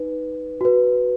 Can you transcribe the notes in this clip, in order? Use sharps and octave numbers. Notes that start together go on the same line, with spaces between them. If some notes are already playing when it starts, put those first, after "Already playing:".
Already playing: D#4 B4
F#4 B4